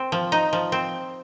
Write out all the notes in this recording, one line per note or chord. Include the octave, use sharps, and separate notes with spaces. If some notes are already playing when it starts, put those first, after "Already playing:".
Already playing: C4
F3
D#4
F3
C4